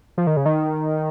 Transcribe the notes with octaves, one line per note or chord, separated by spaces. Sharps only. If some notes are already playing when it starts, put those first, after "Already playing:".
F3
D#3
C#3
D#3